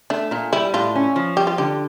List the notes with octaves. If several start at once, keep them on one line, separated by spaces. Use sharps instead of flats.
A3 D4
A#2 D4
G3 E4
A2 F4
C#4
F3
G3 G4
F4
D3 G4